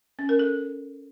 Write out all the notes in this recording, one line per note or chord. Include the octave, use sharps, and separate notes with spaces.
C#4
A#4
A4